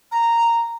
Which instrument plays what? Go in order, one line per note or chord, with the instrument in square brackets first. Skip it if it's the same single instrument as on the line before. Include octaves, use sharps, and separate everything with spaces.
[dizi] A#5